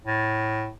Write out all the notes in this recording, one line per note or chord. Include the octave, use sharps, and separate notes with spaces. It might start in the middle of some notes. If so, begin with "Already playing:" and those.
A2